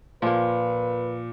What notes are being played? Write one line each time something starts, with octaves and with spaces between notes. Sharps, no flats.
A#2 F3 A#3 B4